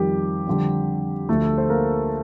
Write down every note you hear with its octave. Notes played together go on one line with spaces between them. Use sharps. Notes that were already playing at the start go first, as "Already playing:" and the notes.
Already playing: F2 D#3 G3 G4
F2 D3 G3
D2 D3 F3 A3 A4
C5
A#3 A#4